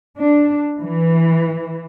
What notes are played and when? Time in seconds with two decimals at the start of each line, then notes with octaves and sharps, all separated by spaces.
0.17 D4
0.81 E3